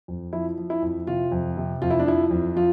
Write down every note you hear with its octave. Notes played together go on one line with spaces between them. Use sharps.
F2
F3 E4
F3
E4
F2
C3 F4
F2
C3
F2 F4
E4
D4
F3 E4
F2
F3 F4